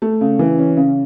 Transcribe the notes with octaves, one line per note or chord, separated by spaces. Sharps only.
A3
C#3
E3
C#4
C#3